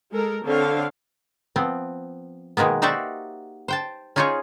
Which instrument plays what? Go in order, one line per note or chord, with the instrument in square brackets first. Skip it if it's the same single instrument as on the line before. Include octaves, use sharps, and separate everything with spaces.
[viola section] G#3 A4 A#4
D3 C4 C#5 F5
[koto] F3 B3 C4
B2 D#3 G#3 A#3 B3
D#4 F#4 G4 C5 D5 E5
C5 G5 A5
C#4 D#4 F4 G#4 C5 C#5